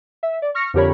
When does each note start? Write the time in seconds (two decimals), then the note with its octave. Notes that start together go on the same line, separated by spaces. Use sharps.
0.23 E5
0.42 D5
0.55 C#6 F6 A#6 C#7
0.74 F2 D3 G4 A#4 C#5 B5